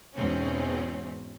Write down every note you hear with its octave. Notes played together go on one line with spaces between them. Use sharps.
E2 G#2 B2 C4 C#4